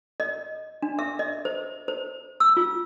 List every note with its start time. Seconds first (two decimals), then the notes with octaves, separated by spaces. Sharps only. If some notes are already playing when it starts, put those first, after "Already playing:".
0.20 D#5
0.82 D4
0.99 E5
1.19 D#5
1.45 C5
1.88 C5
2.40 E6
2.57 F4